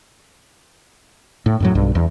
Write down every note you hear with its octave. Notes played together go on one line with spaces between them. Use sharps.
A2
F#2 A2 F#3
B1 G2
E2